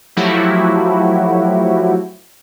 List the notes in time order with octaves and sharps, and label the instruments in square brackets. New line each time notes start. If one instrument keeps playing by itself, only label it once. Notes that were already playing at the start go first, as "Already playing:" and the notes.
[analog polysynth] F3 F#3 A3 E4 F#4 G4